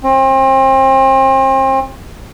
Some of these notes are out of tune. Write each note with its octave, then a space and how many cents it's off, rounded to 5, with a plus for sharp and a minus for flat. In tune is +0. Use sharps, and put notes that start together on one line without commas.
C4 +35